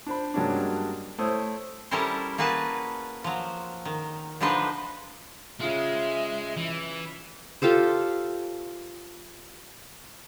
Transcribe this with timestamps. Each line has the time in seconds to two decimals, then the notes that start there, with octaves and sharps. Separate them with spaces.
0.07 D4 C5 B5
0.34 G2 F#3 G#3 A#3 C#4 D4
1.18 A3 E4 C5 C#5 D#6
1.91 G3 C#4 E4 A4 A#4 C5
2.38 A#3 F#4 G#4 B4 A5
3.24 F3 F#3
3.85 D#3
4.41 D3 F3 D4 D#4 B4 C5
5.60 C#3 G#3 F4 E5
6.57 E3
7.62 F4 G4 A4 C5